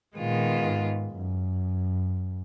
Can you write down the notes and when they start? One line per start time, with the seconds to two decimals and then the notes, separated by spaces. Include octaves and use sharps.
0.16 A#2 D#3 G#3 B3 F4
0.66 G#2
1.16 F#2